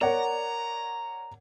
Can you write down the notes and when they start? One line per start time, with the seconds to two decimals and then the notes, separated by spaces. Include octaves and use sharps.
0.01 A#4 C#5 D5 F#5 A#5